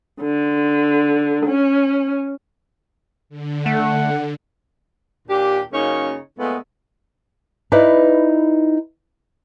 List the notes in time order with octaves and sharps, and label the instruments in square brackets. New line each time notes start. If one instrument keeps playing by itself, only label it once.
[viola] D3
C#4
[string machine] D3
[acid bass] A3 [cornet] F#5
[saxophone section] D#2 A#2 D4 G4
F#2 C#3 A#3 C#4 D#4 C#5
A#2 G#3 A3 B3
[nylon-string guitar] D#4 E4 B4 D5